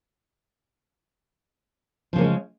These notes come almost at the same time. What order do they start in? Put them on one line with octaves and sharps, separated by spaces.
F3 C#3 A#3 C#4 G#3